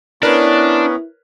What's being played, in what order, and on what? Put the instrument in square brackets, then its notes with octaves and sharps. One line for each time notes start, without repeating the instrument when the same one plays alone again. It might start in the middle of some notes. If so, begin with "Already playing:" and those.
[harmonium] B3 C#4 [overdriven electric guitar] D4 [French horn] E4 [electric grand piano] A#4 B4 C#5